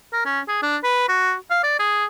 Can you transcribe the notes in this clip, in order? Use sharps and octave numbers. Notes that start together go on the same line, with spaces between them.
A#4
C#4
G#4
D4
B4
F#4
F5
D5
G#4